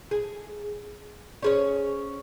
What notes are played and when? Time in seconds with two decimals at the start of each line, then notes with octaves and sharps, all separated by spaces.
0.11 G#4
1.43 C#4 G#4 C#5